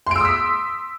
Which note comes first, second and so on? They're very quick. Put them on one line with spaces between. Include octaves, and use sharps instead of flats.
C6 D7 E6 D#6 B6